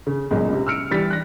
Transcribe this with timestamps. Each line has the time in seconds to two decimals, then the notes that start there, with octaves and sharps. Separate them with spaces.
0.07 C#3
0.31 C#2 F#2 A#2 G#3
0.48 C#2 C3
0.67 E6 F6 C#7 D7
0.91 E3 G3 A6 B6
1.10 F#6 A#6